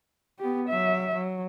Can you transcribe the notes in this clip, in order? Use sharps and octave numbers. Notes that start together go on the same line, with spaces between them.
B3 G4
F#3 E5
F#3